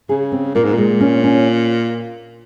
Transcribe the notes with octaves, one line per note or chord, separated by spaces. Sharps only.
C#3 G#4
C4
A#2 A#3
G#2
A#2 G#3
C#4
C#4